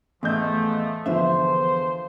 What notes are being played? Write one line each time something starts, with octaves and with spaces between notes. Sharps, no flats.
E2 A2 F3 A3 D#5 G6
E2 D3 F3 B4 C5 E5